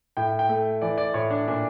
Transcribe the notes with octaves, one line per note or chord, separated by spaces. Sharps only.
A2 G5
G5
A3
E3 D5
D5
A2 C#5
D4
A#2 D4